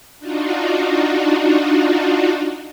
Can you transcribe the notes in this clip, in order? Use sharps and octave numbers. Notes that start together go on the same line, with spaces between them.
D4 D#4 F4 F#4